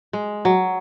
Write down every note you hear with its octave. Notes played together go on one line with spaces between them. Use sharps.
G#3
F#3